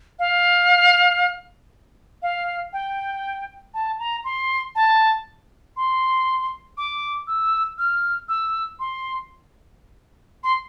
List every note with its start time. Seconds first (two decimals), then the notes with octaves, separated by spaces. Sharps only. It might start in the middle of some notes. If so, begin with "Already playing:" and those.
0.19 F5
2.22 F5
2.73 G5
3.74 A5
3.99 A#5
4.24 C6
4.75 A5
5.77 C6
6.77 D6
7.27 E6
7.78 F6
8.29 E6
8.79 C6
10.44 C6